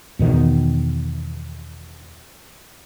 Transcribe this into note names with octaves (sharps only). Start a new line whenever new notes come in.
E2 B2 D#3